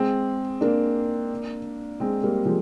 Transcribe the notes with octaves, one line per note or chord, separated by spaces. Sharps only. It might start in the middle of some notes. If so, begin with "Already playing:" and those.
Already playing: G#3 C4
A#3 D4
G#3 C4
G3 A#3
F3 G#3